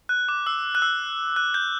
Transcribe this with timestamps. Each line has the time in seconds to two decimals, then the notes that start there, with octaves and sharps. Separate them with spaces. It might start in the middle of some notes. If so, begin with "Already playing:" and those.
0.09 F#6
0.29 D6
0.47 E6
0.75 F#6
0.82 E6
1.36 F#6
1.54 G6